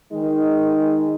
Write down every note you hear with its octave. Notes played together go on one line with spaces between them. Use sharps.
D#3 G#3 D#4